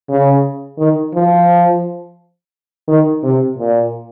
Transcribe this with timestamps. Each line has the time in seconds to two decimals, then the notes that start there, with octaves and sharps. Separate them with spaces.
0.09 C#3
0.78 D#3
1.14 F3
2.88 D#3
3.23 C3
3.58 A#2